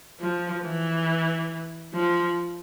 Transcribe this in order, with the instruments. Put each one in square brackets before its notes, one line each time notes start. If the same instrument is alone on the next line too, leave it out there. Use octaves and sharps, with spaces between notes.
[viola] F3
E3
F3